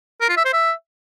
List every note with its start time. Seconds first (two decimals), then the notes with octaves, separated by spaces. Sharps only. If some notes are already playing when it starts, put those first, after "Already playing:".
0.21 A#4
0.29 F4
0.37 E5
0.45 C5
0.53 E5